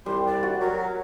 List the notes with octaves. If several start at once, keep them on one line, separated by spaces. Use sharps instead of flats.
C2 G3 C6
D5
F#4
F#3 A#4